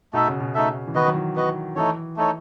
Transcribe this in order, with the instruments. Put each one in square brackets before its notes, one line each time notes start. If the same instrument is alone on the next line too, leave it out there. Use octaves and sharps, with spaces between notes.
[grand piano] B2 [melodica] A3 D#4 A4 E5
[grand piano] C#3
B2
[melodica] A3 D#4 A4 E5
[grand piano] E3
[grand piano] D#3 [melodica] B3 F#4 B4 D#5
[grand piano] F#3
E3
[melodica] B3 F#4 B4 D#5
[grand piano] E3 [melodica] A3 D#4 A4 C#5
[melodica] A3 D#4 A4 C#5